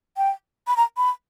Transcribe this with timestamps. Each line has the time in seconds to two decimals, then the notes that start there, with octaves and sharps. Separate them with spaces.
0.17 G5
0.67 B5
0.77 A#5
0.97 B5